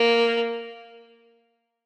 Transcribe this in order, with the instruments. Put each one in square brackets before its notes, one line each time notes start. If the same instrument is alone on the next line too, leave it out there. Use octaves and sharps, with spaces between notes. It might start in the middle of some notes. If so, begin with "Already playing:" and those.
Already playing: [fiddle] A#3